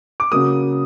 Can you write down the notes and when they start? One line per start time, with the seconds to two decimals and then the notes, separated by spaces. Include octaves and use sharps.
0.20 D6
0.31 C#3 F#3 A#3 D#6